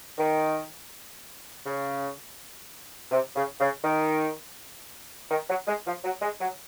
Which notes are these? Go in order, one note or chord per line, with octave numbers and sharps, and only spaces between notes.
D#3
C#3
C3
C#3
C#3
D#3
D#3
F#3
G#3
F3
F#3
G#3
F#3